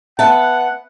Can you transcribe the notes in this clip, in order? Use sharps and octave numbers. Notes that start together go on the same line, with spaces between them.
B3 E5 F#5 A5